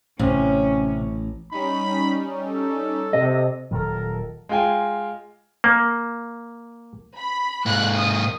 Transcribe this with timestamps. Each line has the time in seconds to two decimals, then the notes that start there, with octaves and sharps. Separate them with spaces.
0.19 A1 C3 C#4
1.52 G3 C#4 D#4 B5
2.47 A4
3.13 C3 D#5
3.71 D#1 D#3 F#3 A4 A#4
4.49 G#3 F4 G5 G#5
5.64 A#3
7.17 B5
7.66 G#2 A#3 F#6
7.95 D#6